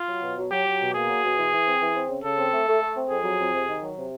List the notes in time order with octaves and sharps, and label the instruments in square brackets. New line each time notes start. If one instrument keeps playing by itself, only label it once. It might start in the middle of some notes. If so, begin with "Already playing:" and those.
Already playing: [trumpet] F4
[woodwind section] F#3
B2
F#3
[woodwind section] F#3 [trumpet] G4
[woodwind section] F#3
B2
[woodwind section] A#3 [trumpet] G#4
[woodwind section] F#3
B2
E3
E3
C4
E3
C4
C#3
[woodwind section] C#3 [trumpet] A4
[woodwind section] C4
A3
A3
A3
C4
[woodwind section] F2 [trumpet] G#4
[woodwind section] F#3
F2
C3
D#3
F#3
C3